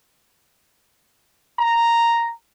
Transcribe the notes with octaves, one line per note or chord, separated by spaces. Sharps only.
A#5